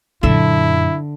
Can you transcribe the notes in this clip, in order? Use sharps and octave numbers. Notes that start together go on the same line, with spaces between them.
F#2 A#2 D3 E4 E5